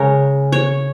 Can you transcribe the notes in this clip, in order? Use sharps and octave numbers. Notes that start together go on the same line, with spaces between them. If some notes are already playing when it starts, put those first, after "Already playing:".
Already playing: C#3 G#3 A#4 C#5
C#5